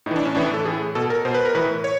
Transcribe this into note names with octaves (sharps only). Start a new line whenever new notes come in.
A2 E3 D4 D#4
C#4
A2 E3 D4
A4
A2 E3 G#4
B2 A4
A#4
B2 C5
B4
A#4
A2 E3 B4
C#5